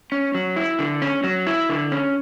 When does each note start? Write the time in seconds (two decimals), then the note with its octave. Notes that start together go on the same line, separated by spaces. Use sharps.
0.12 C#4
0.35 F#3
0.56 E4
0.79 D3
1.02 C#4
1.24 F#3
1.47 E4
1.70 D3
1.92 C#4